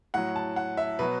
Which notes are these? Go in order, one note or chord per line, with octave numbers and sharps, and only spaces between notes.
A2 F#3 F#5
A5
F#5
E5
B2 F#3 B4